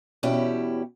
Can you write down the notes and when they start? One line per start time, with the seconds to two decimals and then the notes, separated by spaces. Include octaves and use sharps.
0.23 E2 B2 C#4 E4 G4 G5